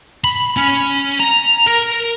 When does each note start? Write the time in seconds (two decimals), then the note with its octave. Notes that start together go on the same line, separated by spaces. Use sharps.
0.24 B5
0.57 C#4
1.20 A#5
1.67 A#4